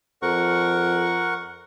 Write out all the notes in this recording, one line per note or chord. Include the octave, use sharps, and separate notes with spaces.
F2 A#4 F#5 C#6